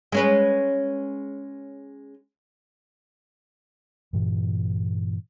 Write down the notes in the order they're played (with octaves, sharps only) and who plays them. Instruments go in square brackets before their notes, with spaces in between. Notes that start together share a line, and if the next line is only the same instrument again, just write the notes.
[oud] G#3 C#4 B4
[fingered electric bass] G2 A#2 E3